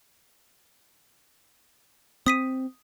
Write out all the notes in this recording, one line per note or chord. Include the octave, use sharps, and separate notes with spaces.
C4 D#6 B6 D#7